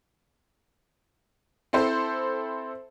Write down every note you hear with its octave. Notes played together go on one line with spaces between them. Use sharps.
C4 E4 A4 C5